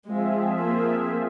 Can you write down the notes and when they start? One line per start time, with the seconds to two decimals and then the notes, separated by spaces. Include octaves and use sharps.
0.08 F3 G#3 C4 F4 G#4 E5
0.64 A#3